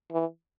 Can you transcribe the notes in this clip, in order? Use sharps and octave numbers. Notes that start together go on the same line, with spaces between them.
E3